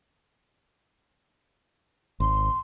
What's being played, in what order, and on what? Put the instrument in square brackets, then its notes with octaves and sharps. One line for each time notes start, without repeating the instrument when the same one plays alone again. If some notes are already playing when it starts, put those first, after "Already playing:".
[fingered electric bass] G#1 [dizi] C6